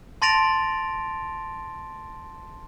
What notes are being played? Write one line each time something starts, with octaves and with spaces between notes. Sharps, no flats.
A5 C6 A6 A#6 D7 F7